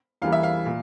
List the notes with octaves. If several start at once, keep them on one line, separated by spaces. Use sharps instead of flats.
E2 E3 G3 A#3 F5
E5
F5
A#2